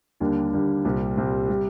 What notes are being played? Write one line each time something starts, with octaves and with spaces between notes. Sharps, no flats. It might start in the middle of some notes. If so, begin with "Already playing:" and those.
D#2 D3 G3 A#3 D4
D#2 D3 G3 A#3 D4
C2 A#2 G3 C4
C2 A#2 G3 C4
C3 G3